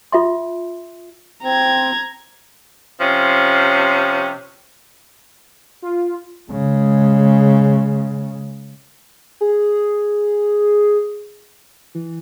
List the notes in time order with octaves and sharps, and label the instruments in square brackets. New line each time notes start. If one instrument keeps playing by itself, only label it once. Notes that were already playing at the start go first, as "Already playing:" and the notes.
[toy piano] F4 E5 C6
[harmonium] C4 [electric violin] A#5 G#6
[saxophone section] C3 F3 C#4
[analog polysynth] F4
[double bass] C#3 G#3
[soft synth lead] G#4
E3